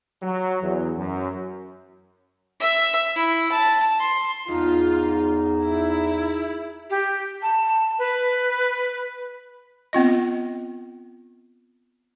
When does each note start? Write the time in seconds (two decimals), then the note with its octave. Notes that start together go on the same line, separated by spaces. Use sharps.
0.23 F#3
0.62 E2
0.96 F#2
2.60 E5
3.16 E4
3.52 A5
3.99 C6
4.48 E2 G#2 D#4 F4
5.63 E4
6.90 G4
7.42 A5
7.99 B4
9.93 B3 C4 F4 D#5